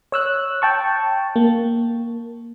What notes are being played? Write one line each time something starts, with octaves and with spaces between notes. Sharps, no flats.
C#5 E6 F#6
G5 A5 C#6
A#3